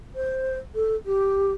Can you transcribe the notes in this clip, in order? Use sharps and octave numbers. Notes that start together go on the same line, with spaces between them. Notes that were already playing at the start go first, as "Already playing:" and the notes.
C5
A4
G4